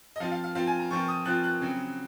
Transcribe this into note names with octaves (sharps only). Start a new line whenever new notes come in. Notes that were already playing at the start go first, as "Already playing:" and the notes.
D#5
F3 C4 F4 F5
F5
F5
F3 C4 F4 F5
G#5
A#5
F3 C4 F4 C#6
D#6
F3 C4 F4 F#6
F#6
C#3 F#3 C4